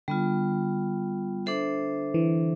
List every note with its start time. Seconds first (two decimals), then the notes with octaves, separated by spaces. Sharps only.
0.08 D3 G3 B3 F4
1.46 D4 A4 C5 E5
2.14 E3